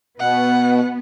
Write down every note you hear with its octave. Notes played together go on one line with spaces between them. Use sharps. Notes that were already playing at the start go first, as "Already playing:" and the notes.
B2 B3 F#5